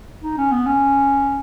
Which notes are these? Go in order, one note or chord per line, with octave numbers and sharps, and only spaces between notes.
D#4
C#4
B3
C#4